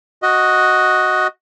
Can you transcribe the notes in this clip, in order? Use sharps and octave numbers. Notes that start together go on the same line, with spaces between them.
F#4 D#5